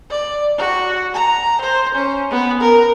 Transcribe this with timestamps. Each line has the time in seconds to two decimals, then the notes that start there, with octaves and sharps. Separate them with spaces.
0.10 D5
0.58 F#4
1.14 A#5
1.61 C5
1.95 C#4
2.31 B3
2.61 A#4